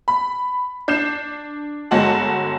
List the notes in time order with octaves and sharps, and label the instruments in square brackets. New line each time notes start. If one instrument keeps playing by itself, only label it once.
[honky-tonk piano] B5
D4 G6 C7 E7
G1 G#3 F#4 A5 F#7